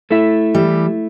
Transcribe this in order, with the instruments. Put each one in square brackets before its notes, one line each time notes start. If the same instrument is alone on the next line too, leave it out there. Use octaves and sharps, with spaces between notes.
[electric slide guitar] A3 E4 A4 E5
[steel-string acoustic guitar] E3 G3